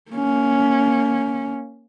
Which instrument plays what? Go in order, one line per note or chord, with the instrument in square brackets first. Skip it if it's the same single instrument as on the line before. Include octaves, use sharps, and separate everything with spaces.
[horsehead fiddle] A#3 C#4